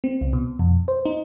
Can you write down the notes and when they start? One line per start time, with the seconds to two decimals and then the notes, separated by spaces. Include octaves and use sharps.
0.04 C4
0.21 C#2
0.33 B2
0.59 F2
0.88 C5
1.05 D#4